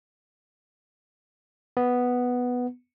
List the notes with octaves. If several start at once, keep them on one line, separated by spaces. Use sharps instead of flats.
B3